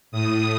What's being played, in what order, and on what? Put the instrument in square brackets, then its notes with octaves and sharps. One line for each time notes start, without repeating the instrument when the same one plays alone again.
[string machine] A2 D#6